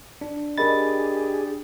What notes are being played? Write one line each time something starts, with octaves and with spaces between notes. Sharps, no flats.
D4
D4 G4 G#4 A#4 D#5 B5 A6